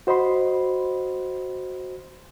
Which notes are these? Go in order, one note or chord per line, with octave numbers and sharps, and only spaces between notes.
F#4 C5 D#5 B5 C6